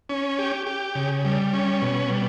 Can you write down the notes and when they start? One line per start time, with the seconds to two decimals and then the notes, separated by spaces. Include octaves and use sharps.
0.09 C#4
0.39 G4
0.67 G4
0.95 C#3
1.25 G3
1.53 C#4
1.82 B2
2.10 G3